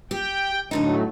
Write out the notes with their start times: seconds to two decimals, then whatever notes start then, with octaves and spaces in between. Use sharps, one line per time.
0.11 G4 G5
0.71 D2 A2 D3 F#3 A3 D#4